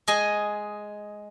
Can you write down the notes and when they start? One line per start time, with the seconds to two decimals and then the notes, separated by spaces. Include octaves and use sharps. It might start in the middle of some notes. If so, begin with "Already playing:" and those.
0.08 G#3 G#4 D#5 G#5